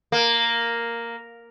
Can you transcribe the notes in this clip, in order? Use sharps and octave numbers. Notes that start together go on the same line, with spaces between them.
A#3